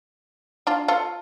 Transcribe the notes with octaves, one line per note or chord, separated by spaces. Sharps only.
D4 F4
F4 A4